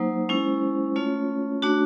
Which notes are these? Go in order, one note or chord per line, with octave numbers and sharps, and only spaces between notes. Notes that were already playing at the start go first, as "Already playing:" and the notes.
Already playing: F#3 A#3 D#4 C5
G#3 C#4 E4
A3 C#4 F4 C#5
A3 D4 F#4